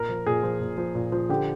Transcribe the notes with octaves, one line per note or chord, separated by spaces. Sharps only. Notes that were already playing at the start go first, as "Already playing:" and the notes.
Already playing: A#2 A#4
F3
A#2 G#4
F3
A#2
F3
A#2
F3
D3 G4